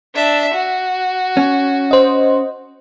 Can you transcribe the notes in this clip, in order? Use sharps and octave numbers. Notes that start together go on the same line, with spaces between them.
D4 E5
F#4
C#4
C5 D#5